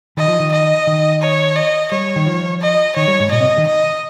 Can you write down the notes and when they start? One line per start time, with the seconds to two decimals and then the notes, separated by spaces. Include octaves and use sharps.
0.17 D#3 D#5
0.28 F3
0.40 D#3
0.52 D#5
0.87 D#3
1.22 C#5
1.56 D#5
1.91 G3 C#5
2.16 D#3
2.26 F3
2.62 D#5
2.96 D#3 C#5
3.08 G3
3.20 G#2
3.31 A#2 D#5
3.40 C3
3.58 D#3
3.67 D#5